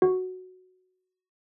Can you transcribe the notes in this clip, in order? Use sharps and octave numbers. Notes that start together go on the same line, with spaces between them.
F#4